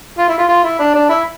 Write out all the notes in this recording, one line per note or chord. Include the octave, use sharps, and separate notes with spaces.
F4
E4
F4
F4
E4
D4
D4
E4